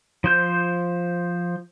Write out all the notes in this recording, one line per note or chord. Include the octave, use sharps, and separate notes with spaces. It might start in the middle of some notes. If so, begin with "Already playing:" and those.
F3 C5 G6